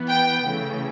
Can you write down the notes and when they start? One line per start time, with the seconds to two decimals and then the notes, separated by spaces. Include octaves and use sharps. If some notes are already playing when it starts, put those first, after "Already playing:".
Already playing: E3 B3
0.09 G5
0.45 C#3 E3 A3